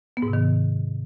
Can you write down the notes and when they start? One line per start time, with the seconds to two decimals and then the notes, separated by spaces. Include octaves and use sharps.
0.17 B3
0.22 G#2
0.28 C3
0.33 D#3